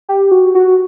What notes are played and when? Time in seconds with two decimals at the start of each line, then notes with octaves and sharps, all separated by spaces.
0.09 G4
0.32 F#4
0.55 F#4